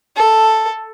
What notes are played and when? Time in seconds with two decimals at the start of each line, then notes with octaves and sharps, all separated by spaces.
0.17 A4